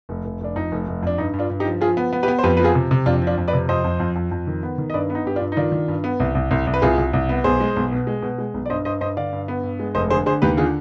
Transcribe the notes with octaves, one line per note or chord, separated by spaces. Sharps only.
F1
F1
F1 D4
F2 D#4
F1
F1
F2 D4
G2 D#4
G2
D4 F4
G2
D#4 G4
F3
F3 F4 G#4
B3
B3
G4 B4
B3
C5
F2 G4 B4
B4
F3 F4 G#4
C3
C3
F2 D4 F4
F3
D4 F4
F2
B4 D5
C3
F2 C5 D#5
F2
F2
F2
F2
D#3
B3
D#3
D#5
G2 B4 D5
B3
D#4
G2 G4
D4 F4
G2
D#4
D#3 D4 F4
D#3
G2
B3
C2
C2
C2
C2
B4
C2 F4 G#4
C2
C2
B3
B1 G#4 C5
G#3
B1
B2
G#3
B2
G#3
B1
D5
G2 C5 D#5
G2 C5 D#5
G2 C5 D#5
D3 D5 F5
G2
B3
G2
G#3
F1 C5 D#5
D3 G#4 C5
D3 G#4 C5
D#2 G4 B4
D3 F4 G#4